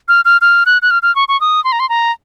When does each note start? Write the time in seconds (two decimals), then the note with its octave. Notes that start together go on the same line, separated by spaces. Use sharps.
0.08 F6
0.25 F6
0.41 F6
0.66 F#6
0.82 F#6
0.91 F6
1.03 F6
1.16 C#6
1.28 C#6
1.41 D#6
1.64 C6
1.72 A#5
1.80 C6
1.89 A#5